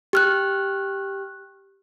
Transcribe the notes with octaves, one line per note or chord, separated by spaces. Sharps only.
G4 F6 F#6